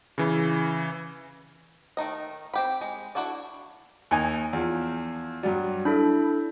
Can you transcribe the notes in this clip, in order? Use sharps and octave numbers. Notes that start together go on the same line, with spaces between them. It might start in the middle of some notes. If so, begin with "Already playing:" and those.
C#3 E3
D#3 A3 D#4 D#5
C4 G4 B5
G#3
D4 E4 F#4 A4 D5
D#2 D#4 G#5
E2 F3
G2 F#3 D5
D4 E4 A4 B5